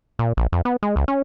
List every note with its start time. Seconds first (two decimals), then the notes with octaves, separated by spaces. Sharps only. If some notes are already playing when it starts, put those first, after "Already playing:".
0.19 A#2
0.37 A#1
0.52 F2
0.65 B3
0.83 G#3
0.96 C#2
1.08 C#4